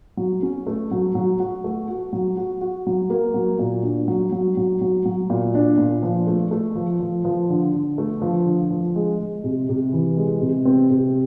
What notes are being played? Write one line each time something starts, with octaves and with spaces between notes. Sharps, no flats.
F#3
C#4
A3
F#3
F#3
F#4
A3
F#4
F#3
F#4
F#4
F#3
A#3
F#3
A#2
D4
F#3
F#3
F#3
F#3
F#3
A#2
D4
A#2
F3
A3
A3
F3
F3
F3
D3
D3
A3
F3
D3
F3
G#3
G#3
C3
C3
E3
G#3
C3
C4
C3